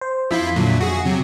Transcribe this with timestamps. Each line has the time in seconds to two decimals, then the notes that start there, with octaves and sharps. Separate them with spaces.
0.01 C5
0.30 F2 F3 E4 F4 E5 B6
0.56 A#2 D3 F#3
0.81 F#4 G#4
1.05 C3 F#3